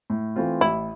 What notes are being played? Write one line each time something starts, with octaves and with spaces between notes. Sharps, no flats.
A2
E3 A3 C4 F4
A1 E4